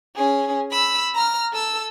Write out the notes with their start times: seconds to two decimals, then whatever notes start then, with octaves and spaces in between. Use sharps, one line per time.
0.16 C#4 G#4
0.71 B5 E6
1.15 A#5 F6
1.53 A4 E6